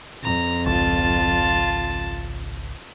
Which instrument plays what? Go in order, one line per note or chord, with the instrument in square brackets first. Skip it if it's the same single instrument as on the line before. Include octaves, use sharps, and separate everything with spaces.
[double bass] F2 [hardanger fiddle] A#5
[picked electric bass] G#1 C#2 [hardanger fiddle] F4 A5